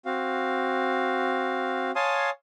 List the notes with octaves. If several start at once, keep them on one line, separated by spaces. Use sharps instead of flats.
C4 F#4 F5
C#5 F5 G#5 A5 C6 D#6